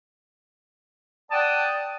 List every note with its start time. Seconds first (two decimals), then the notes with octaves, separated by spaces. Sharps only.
1.31 D5 F#5 G5 A5 D#6